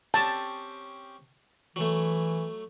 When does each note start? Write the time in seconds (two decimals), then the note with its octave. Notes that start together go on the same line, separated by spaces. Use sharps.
0.14 C4 C#4 G4 A5
1.76 E3 F#3 A3